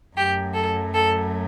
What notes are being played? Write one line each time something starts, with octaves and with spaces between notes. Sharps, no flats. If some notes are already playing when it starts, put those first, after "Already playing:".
F#2 F#3 A3 G4
A4
A4